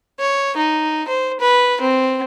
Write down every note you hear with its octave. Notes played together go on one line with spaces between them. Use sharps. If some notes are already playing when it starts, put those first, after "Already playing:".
C#5
D#4
C5
B4
C4